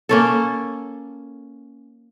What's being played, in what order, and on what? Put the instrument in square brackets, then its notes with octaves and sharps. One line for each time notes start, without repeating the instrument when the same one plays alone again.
[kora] A#3 C#4 A4